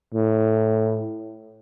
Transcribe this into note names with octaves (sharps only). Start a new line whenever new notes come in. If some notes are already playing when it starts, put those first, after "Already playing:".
A2